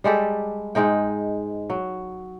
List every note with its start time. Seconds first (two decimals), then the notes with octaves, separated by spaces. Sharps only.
0.04 G3 G#3 G4 A4
0.75 G#2 G#3 D#4 G5
1.70 F#3